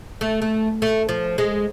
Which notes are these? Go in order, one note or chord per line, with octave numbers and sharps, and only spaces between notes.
A3
A3
A3
F3
G#3